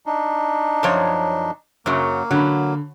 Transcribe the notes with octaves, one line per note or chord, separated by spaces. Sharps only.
D4 D#4
F#2 F3 C#5
F#2 C#3 F#3 A#3
D3 F#3 B5